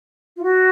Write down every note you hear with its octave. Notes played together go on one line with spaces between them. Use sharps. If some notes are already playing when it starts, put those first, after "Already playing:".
F4
F#4